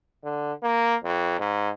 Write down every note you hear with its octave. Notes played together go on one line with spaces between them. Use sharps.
D3
A#3
F2
G#2